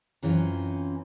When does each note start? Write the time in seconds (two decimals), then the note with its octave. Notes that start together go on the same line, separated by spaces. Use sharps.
0.23 F#2 E3 C4 C#4 F4